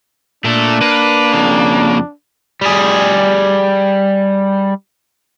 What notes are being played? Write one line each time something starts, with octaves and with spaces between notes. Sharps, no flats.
A#2 A3 D4 A4
A#3 B4
F2 C#3
G3 G#4